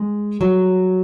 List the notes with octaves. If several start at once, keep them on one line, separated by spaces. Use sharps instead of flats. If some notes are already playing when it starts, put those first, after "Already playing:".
Already playing: G#3
F#3